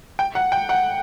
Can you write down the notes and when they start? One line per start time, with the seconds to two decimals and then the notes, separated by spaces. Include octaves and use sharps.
0.19 G5
0.35 F#5
0.52 G5
0.69 F#5